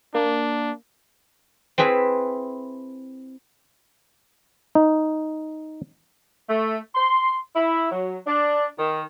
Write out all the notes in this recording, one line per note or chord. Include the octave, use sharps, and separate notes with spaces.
A#3 D4
C4 E4 G#4 B4 E5
D#4
A3
C6
E4
F#3
D4
D#3